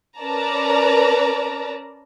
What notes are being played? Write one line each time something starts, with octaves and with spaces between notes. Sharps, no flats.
C#4 A#4 B4 D5 A5 A#5